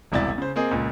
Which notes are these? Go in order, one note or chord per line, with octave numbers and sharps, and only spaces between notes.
E1 C2 E4 D5 A6
C#3 C5
A#3 C4 G#4 D#5
C#2 A#2